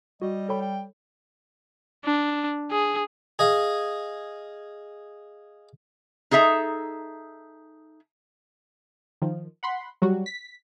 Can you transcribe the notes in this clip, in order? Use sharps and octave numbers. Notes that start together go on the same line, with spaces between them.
G3 F#4 D#5
A4 C#5 G5 B5
G5
D4
G#4
G#4 D#5 F5
D#4 G#4 A4 E5 A#5
D#3 F3
F#5 B5 C6
F#3 G3 F#4
B6